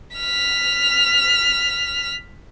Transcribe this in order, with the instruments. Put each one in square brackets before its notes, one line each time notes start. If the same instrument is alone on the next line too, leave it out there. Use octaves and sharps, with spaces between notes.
[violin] F6 B6